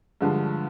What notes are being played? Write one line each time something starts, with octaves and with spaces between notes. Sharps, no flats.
G2 D3 F3 G#3